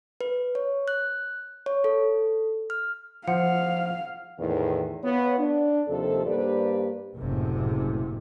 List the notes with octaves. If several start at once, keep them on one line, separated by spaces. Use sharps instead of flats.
B4
C#5
F#6
C#5
A4
F6
F3 F5 F#5
E2 A2 D#3
B3 F4 C#5
D4
D#2 C3 F3 A4
G2 A#3 G4 B4 C5 D5
F#1 A2 C3